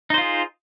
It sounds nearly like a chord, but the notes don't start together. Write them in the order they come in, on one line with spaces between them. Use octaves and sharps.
D#4 C5 F4 G#4